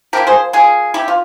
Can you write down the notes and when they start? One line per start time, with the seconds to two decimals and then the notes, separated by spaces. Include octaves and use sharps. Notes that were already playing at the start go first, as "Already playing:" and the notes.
0.13 F3 A#3 E4 G4 A#4
0.27 G#4 C5
0.53 F4 G#4
0.94 E4 G4
1.08 F4